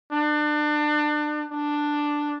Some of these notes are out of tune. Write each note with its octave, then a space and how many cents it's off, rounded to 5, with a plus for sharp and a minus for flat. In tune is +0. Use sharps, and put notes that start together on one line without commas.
D4 +30
D4 +5